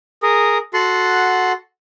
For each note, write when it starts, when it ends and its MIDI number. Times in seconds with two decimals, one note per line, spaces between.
0.23 0.58 68
0.23 0.58 70
0.73 1.52 66
0.73 1.52 69
0.73 1.52 78
0.73 1.52 84